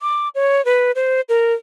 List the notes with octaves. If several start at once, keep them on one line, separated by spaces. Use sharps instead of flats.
D6
C#5
B4
C5
A#4